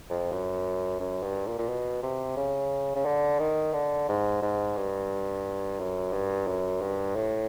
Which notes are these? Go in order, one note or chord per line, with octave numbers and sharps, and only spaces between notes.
F2
F#2
F#2
G2
A#2
A#2
B2
C3
C#3
C#3
D3
D#3
D3
G#2
G#2
G2
F#2
G2
F#2
G2
A2